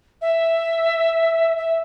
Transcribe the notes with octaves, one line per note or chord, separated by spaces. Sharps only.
E5
E5